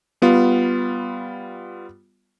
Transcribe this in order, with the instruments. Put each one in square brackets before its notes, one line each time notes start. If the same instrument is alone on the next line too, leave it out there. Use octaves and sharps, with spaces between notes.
[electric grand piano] G3 B3 F4